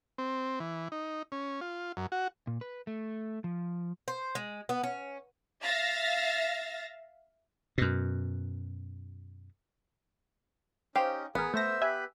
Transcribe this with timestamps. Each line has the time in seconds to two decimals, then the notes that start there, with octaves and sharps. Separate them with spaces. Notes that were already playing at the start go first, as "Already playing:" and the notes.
0.18 C4
0.60 E3
0.92 D#4
1.32 C#4
1.61 F4
1.97 F#2
2.12 F#4
2.47 A#2
2.61 B4
2.87 A3
3.44 F3
4.08 C5
4.35 G#3
4.69 B3
4.83 C#4
5.62 E5 F5 A6 A#6
7.78 F#2 B2
10.96 C#4 D#4 G4 C5 F5
11.35 A1 B3 G#4 A#4
11.54 A3 C5 E5 A#6
11.82 G4 B4 E5 G#5 B5